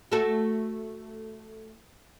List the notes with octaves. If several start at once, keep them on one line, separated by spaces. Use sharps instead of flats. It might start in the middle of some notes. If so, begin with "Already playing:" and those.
A3 F#4 A4